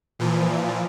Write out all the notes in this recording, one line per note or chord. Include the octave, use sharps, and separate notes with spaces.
A#2 E3 F3